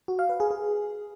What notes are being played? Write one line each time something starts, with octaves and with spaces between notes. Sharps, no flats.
F#4
F5
B4
G#4
G#4